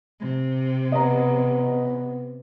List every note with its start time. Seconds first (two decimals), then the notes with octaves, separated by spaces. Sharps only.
0.20 C3
0.92 B3 D#5 A#5